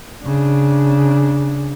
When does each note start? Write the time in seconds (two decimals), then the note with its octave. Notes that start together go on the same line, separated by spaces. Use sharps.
0.22 C#3 D4